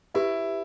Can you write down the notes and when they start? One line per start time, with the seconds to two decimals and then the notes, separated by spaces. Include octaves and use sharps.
0.15 E4 G4 B4 E5